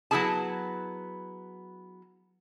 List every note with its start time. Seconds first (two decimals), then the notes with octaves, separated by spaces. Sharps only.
0.11 F#3 B3 C#4 E4 G#4 A5